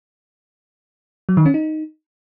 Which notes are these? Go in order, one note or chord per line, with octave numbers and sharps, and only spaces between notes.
F#3
D#3
C#4
D#4